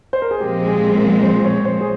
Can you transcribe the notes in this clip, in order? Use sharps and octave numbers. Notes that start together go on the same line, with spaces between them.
C5
A#4
G#4
A#2 F3 G#3 C4 G4
G#4
A#4
C5
C#5
C5
G#4